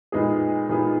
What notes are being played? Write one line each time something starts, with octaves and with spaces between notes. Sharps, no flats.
A#2 G#3 B3 D#4 G#4
A#2 G#3 B3 D#4 G#4